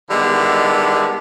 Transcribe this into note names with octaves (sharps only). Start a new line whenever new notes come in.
D3 D#3 G3 G#3 B3 E4